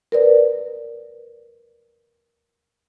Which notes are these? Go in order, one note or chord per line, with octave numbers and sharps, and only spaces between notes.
A#4 B4 D5